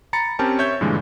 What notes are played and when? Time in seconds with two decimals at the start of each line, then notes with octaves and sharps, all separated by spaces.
0.13 A#5 B5 A6 C#7
0.39 C4 C#4 G4 A#4 A5
0.59 C#5 E5 G6
0.81 G2 A#2 D3 E3 G#3